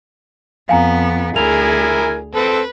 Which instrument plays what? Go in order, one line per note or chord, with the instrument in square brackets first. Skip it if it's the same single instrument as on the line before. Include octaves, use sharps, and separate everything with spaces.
[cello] F2 B3 [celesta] F5 G#5 A#5
[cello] D2 G#4 [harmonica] E4 A#4 G#5 [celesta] F7
[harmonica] C4 A4 [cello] B4